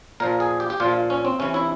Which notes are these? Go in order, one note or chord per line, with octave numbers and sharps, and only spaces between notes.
A#2 F3 A#4
G#4
G4
G4
A#2 F3 F4
C#4
C4
C3 E3 C#4
E4